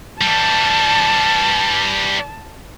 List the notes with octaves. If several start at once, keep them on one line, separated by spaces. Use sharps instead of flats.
E3 G3 A5